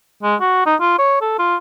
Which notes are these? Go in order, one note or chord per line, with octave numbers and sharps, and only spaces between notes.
G#3
F#4
D#4
F4
C#5
A4
F4